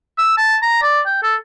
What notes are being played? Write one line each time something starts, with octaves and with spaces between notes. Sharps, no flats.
E6
A5
A#5
D5
G5
A4